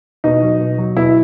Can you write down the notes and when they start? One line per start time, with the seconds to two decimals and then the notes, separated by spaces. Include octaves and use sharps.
0.24 B2 D#4
0.42 F#3
0.60 B2
0.78 F#3
0.96 B2 E4